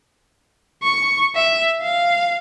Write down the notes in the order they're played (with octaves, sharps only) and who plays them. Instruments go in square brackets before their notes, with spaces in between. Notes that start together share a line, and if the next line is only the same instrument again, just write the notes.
[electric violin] C#6
E5
F5